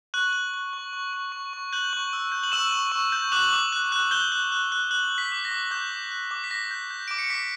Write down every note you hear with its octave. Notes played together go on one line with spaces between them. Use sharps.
C#6 F#6 F#7
F#6
F#6
C#6
C#6
C#6
C#6
C#6
F#6 G6 F#7
C#6
E6
G6
F#7
C#6 E6 E7
C#6
C#6
G6
D6 F#6 F#7
D6
F#6
F#6
F#6 G6 G7
F#6
F#6
F#6
F#6 F#7
F#6
B6
D6
A#6
D6
D6 G6
D6
F#6
D6
B6
D6 A#6
G6
G6
D6 D7
C#7
D6 B6